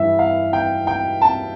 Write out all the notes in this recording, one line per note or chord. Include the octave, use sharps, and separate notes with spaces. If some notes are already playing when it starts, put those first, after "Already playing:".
Already playing: G2 E3 E5
F5
G5
G5
A5